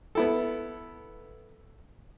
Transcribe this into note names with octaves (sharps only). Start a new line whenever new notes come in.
B3 E4 A4